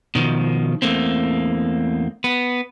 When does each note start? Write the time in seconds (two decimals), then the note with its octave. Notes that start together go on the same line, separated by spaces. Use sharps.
0.15 B2 D#3 F3
0.82 E2 A3 A#3 C4
2.24 B3